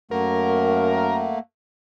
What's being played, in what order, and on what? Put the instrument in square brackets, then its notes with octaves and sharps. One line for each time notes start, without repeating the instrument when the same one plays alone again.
[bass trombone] F#2 [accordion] A3 A#3 [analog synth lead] A#4 [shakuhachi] F#5